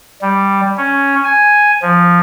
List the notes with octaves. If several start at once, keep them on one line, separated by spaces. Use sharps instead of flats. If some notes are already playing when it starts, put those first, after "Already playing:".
G3
C#4
G#5
F3